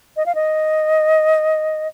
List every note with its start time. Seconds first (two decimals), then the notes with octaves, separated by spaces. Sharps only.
0.17 D#5
0.26 F5
0.35 D#5